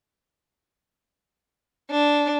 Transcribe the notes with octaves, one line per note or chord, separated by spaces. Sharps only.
D4